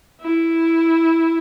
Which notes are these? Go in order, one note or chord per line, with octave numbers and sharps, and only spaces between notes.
E4